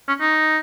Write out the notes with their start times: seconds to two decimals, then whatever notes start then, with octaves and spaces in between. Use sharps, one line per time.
0.08 C#4
0.21 D#4